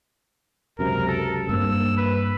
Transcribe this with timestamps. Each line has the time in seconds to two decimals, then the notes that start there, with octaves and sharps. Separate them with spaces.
0.79 C#2 F#2 C3 A#4
1.08 A4
1.49 G2 A#3 C4 E6
1.97 B4